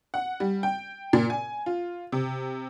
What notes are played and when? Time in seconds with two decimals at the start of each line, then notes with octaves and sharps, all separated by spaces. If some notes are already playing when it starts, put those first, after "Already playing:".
0.14 F#5
0.40 G3
0.63 G5
1.13 A#2
1.30 G#5
1.66 F4
2.12 C3